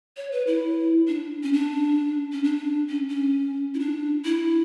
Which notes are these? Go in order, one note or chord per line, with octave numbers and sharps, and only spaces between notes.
C#5
B4
E4
D4
C#4
D4
C#4
D4
C#4
C#4
E4
D4
E4